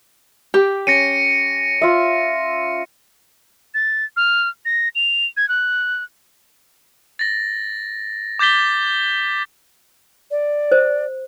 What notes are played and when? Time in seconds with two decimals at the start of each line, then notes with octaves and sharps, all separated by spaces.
0.54 G4 D6
0.87 C#4 A#6 C#7 D#7
1.82 F4 E5
3.74 A6
4.16 F6
4.65 A#6
4.95 F7
5.37 G#6
5.49 F#6
7.19 A6 A#6
8.39 D6 G6 A6 B6 G7
10.31 D5
10.72 C5